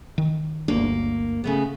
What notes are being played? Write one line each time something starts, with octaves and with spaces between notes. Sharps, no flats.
D#3
G1 D2 A#3 D4
C#3 A3 B3